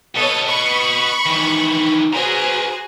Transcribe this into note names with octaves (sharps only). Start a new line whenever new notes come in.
A4 B4 C#5 D#5
B5 C#6
D#3 E3
F#4 G#4 B4 C5 A#5